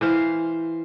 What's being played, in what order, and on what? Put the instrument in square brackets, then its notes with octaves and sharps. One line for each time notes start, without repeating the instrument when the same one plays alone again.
[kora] E3 C5 F5